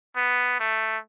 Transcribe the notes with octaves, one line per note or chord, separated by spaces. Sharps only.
B3
A3